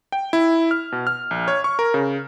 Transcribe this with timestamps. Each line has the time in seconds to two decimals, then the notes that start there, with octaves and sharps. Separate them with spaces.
0.12 G5
0.33 E4
0.71 F6
0.92 B2
1.07 F6
1.31 A#1
1.48 C#5
1.64 C#6
1.79 A#4
1.94 C#3